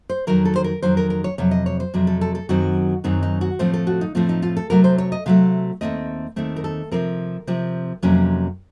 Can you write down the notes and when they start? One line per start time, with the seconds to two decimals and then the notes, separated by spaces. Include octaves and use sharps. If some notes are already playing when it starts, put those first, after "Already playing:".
0.09 C5
0.27 F2 D#3 F#3 A#4
0.45 A4
0.56 C5
0.64 A#4
0.82 F2 D#3 F#3 C5
0.97 A#4
1.10 A#4
1.24 C#5
1.38 F2 C3 F#3 C#5
1.51 D#5
1.66 C#5
1.80 C5
1.94 F2 C3 F#3
2.07 A4
2.21 A4
2.35 A4
2.49 F#2 D#3 F#3 C4 F#4
3.04 F#2 D#3 F#3 C4 D#4
3.23 D#4
3.41 F#4
3.59 A2 F3 A3 C4 C5
3.74 A4
3.87 F#4
4.01 D#4
4.15 A2 F3 A3 C4 F4
4.29 D#4
4.42 F4
4.57 A4
4.70 C3 F#3 A3 A#4
4.84 C5
4.98 C#5
5.12 D#5
5.26 C3 F#3 A3 F5
5.81 D#2 D#3 A3 C4 D#5
6.36 D#2 D#3 A3 C4
6.56 A#4
6.64 A4
6.91 C3 F3 C4 A#4
7.47 C3 F3 C4
8.03 F2 C3 F#3 A#3 C#4